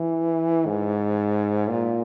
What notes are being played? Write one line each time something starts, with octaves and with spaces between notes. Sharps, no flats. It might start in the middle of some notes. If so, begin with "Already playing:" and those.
Already playing: E3
G#2
A#2